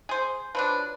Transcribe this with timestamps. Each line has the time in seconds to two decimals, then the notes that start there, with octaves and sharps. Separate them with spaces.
0.09 G#4 C5
0.55 F3 F#3 D4 B4